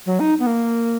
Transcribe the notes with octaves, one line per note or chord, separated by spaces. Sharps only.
F#3
D#4
B3
A#3